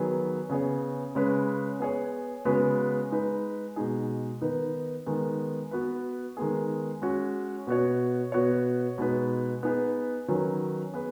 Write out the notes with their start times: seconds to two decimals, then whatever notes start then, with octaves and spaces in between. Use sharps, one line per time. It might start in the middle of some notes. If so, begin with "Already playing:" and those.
Already playing: D#3 F#3 B3 G#4 B4
0.49 C#3 B3 G#4 C#5
1.15 C#3 G#3 C#4 B4
1.80 B3 G#4 C#5
2.45 C#3 G#3 B3 F#4 B4
3.11 G#3 D#4 B4
3.76 B2 G#3 D#4 G#4
4.41 D#3 B3 D#4 B4
5.06 D#3 G#3 B3
5.71 B3 F#4 B4
6.37 D#3 G#3 B3 G#4
7.02 G#3 C#4 F#4
7.67 B2 B3 F#4 C#5
8.32 B2 B3 F#4 C#5
8.98 B2 G#3 D#4 B4
9.63 B3 D#4 G#4 B4
10.28 D#3 F#3 C#4 B4
10.94 B3 G#4 B4